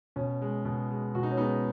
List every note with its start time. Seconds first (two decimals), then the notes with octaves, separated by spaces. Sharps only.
0.16 B2 C#4
0.41 G#3
0.65 B2
0.91 G#3
1.15 B2 F#4
1.23 D#4
1.31 C#4
1.37 G#3 B3 D#4